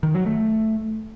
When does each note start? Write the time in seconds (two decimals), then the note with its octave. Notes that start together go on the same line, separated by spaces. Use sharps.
0.03 D#3
0.15 F#3
0.26 A3